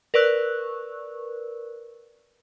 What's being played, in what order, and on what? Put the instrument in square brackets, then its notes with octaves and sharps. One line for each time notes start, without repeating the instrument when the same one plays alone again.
[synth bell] A#4 B4 D5 C#6 E6 F#6